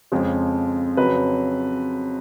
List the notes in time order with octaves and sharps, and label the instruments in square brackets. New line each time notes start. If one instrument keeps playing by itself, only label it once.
[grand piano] F2 C#3 F3 G#3
F2 C#3 F#3 B4